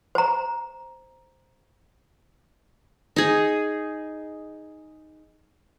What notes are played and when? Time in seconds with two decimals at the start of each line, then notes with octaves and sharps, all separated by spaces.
0.15 C5 A#5
3.16 D#4 G#4